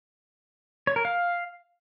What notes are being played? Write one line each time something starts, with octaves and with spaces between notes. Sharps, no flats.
C#5
A#4
F5